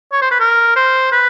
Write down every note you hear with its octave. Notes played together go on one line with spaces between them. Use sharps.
C#5
C5
B4
A#4
C5
B4